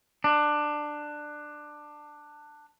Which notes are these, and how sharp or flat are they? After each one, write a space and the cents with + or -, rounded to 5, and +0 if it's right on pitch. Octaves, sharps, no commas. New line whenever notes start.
D4 +15